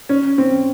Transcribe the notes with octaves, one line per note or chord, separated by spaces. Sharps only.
C#4
C4